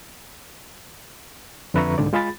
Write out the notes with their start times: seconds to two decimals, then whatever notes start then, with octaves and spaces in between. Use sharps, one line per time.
1.74 F2 D3 B4 E5 A#5 C#6
1.98 C2 G#2 D3 D5
2.13 G#3 F4 G#4 B5 A6